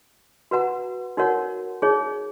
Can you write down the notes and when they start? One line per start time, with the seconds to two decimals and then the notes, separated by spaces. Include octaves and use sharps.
0.51 F#4 B4 F#5 A#5
1.17 D#4 F#4 A#4 C#5 F#5
1.82 D#4 G#4 C#5